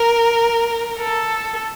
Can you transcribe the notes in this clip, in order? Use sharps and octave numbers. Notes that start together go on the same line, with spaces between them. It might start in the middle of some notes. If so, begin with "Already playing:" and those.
Already playing: A#4
A4